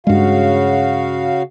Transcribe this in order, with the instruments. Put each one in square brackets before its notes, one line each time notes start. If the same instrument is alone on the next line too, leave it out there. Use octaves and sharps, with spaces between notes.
[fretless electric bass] G2 G#3 [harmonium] C#3 F#4 F5